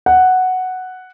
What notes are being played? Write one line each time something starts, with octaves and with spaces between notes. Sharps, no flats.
F#5